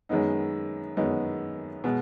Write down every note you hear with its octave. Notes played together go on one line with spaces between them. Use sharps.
F#2 D#3 G#3 B3 D#4
F#2 D#3 G#3 B3 D#4
B2 G#3 B3